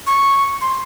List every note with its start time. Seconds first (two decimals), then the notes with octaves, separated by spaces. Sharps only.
0.07 C#6
0.61 C6